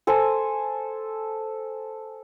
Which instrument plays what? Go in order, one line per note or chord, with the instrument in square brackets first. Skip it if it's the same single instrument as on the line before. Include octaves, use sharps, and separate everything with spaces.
[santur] A4 C5 G#5